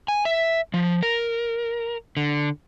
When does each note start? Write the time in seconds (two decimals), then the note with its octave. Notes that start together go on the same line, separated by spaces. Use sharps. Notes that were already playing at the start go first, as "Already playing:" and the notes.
0.08 G#5
0.25 E5
0.74 F3
1.03 A#4
2.17 D3